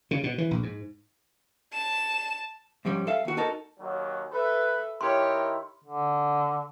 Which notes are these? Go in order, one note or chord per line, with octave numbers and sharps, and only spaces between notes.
C#3
B2
E3
A#1
G#2
A5 E7
G#2 F3 G3 C#4
A4 E5 F5
D#2 F#4
D#4 F#4 A4 A#4
D#2 F#3
A4 B4 E5
D#3 E4 G4 A#4 C#5 C6
D3